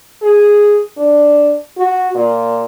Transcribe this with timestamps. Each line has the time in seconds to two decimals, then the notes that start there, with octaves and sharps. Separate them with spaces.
0.22 G#4
0.98 D4
1.78 F#4
2.15 A#2